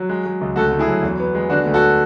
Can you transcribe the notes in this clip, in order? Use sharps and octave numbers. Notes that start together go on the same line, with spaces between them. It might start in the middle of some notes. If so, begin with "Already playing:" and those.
Already playing: F#3
G#3
G#3
C#2
D2 F#4 A4
D2
E4 G#4
F#3
E2
B3
G#3
D3 D4 F#4
D2
F#4 A4